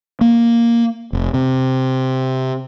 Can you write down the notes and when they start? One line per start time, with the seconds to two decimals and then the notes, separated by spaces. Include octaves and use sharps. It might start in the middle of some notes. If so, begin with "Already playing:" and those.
0.21 A#3
1.13 F1
1.34 C3